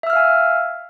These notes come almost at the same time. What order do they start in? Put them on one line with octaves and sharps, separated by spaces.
E5 E6 F6 F5 G#5